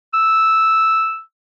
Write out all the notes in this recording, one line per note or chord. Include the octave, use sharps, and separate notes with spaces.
E6